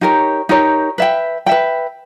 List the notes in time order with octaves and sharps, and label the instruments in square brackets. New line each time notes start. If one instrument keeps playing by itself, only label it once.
[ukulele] D#4 G4 A#4 C#5
D#4 G4 A#4 C#5
B4 E5 G5
B4 E5 G5